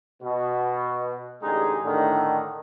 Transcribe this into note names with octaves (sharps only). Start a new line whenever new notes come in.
B2
A1 D3 G#3 D#4 G4 G#4
A2 D3 D#3